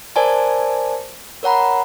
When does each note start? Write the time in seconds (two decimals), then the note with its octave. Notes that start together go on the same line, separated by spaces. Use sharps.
0.16 A#4 C5 D5 G#5 A5
1.43 A#4 C#5 F#5 A#5 B5